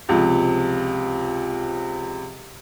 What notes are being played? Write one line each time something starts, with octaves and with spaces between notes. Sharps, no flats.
C#2 C3 F3